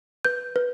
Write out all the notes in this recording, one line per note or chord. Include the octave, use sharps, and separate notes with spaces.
B4 G6
B4